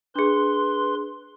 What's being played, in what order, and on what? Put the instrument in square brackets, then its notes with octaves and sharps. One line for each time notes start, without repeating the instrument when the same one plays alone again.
[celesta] D4 G#4 [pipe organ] B4 C6